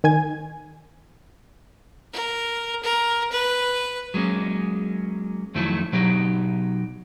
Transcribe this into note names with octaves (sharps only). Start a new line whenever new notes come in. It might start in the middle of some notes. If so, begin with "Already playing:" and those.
D#3 G#5 G#6
A#4
A#4
B4
F#3 G#3 A#3 C#4
F2 D#3 F#3 A3 E4 A4
B2 F#3 D#4 G4